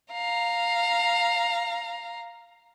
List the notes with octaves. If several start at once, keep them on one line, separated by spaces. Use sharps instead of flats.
F5 A#5